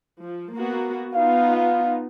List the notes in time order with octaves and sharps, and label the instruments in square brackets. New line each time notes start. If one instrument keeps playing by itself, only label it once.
[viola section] F3
A#3 B3 F#4
[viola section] B3 D#4 F4 [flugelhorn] F5
[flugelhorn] F5